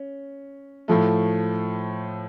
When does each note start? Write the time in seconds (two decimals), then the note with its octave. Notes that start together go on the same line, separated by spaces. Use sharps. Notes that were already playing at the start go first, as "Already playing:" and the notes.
Already playing: C#4
0.88 A2 F3 A3